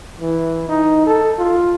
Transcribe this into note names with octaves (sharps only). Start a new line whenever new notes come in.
E3
D#4
A4
F4